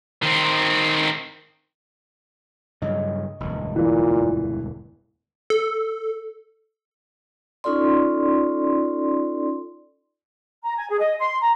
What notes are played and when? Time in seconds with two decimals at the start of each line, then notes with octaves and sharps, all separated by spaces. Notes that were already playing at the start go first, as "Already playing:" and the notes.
0.22 D#3 C4
2.82 G2 C#3 F#3 D#5
3.40 E1 D2 G2
3.76 A#2 E3
5.50 A4
7.64 C#4 D#4 F4 A4 D5 C6
10.63 A#5
10.76 G#5
10.89 G#4
11.00 D#5
11.19 C6
11.41 A#5